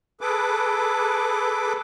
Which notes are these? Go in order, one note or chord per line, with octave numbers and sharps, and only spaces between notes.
G#4 A4 B4 D6